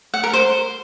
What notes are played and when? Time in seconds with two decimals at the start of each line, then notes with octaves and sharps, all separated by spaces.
0.14 F#5
0.24 A#4
0.33 C5